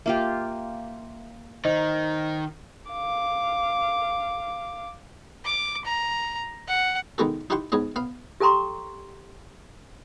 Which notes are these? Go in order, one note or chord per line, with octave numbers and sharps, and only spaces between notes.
A#3 F4 G4 E5
D#3 C5 D#5
F5 D6
D6
A#5
F#5
D#3 G#3 B3 F#4 A4
D#4 E4 G4 F#5 C6 C#6
G#2 B3 G#4 D#5
B3 F5
G4 A4 G5 A#5 C6 C#6